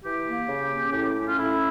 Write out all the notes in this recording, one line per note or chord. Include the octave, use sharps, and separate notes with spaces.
E3 G4
A#3
C#3
C#4
A2 G4
C#4
F4
A2 E4